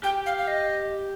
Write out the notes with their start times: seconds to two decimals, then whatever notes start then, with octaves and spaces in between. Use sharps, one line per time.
0.03 G4 G5
0.26 F5
0.38 F5
0.48 D#5